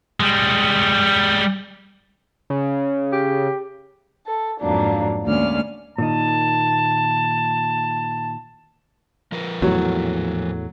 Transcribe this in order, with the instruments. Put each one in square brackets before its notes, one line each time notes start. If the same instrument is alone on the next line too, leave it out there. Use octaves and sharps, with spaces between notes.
[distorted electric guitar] G3 G#3
[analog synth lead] C#3
[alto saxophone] G4
[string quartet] A4
F2 G#2 F#3 A#3 D4
D2 G#3 A#3 C#4 D5 F6
[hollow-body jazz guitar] A#2 D#3 D#4 [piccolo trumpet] A5
[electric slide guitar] F3 A#4 B4
[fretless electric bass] E2 A2 [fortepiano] F#3